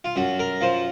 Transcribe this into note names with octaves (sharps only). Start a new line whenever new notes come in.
F4
F#2 F#4
A#4
F3 C5